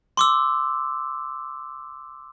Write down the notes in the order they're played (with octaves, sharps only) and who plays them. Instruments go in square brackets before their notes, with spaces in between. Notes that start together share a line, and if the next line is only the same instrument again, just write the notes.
[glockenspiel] C6 D6 E6